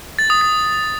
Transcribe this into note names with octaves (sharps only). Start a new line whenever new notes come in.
A6
D#6
A6